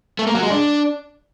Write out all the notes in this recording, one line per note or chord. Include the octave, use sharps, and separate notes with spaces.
A3
A#3
F#3
G#3
D4